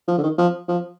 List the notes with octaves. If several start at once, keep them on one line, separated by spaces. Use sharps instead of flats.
F3
D3
D#3
F3
F3